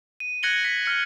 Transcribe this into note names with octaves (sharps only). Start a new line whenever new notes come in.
D#7
F#6 G#6 A#6 C#7 F#7 G7
B6
F6 C#7